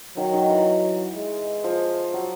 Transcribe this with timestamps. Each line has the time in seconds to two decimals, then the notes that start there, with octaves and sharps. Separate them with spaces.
0.17 D#3 F#3
0.34 D#3
0.50 E3
1.15 G#3
1.64 F3
2.14 F#3